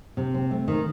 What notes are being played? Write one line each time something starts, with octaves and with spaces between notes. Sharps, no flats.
C3
C4
A3
D#3